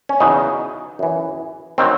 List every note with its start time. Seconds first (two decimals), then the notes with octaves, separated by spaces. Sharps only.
0.09 C#4
0.20 E2 C#3 F#3 D#4
0.99 F#2 E3
1.78 D#3 F#3 C4